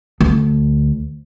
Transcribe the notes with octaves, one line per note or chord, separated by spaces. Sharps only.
D2